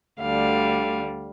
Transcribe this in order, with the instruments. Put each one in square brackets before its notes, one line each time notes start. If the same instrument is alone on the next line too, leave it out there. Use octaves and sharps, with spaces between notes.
[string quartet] D2 D3 G3 F5